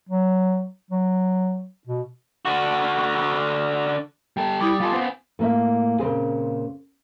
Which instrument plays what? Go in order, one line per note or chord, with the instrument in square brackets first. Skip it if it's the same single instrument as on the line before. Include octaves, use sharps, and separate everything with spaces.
[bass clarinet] F#3
F#3
B2
[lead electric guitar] D3 F#4
[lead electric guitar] G3 A4 [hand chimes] G5
[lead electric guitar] G3 [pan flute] E4 [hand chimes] D6 D#6 A6
[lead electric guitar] G3 A4 [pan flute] F4 [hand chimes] F5 G#5
[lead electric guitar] B3 C4
[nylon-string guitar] A2 A#3 E5
A#2 C#3 C4 G#4